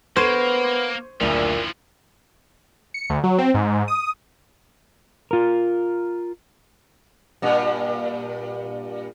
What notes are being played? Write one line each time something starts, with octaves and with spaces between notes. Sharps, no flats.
A#3 B3 C5 C#6 G#6 D#7
F#1 D2 A#2 E3 F3 D4
C#7
D2
F#3
C4
G#2
D#6
F4 A#4
G2 A#2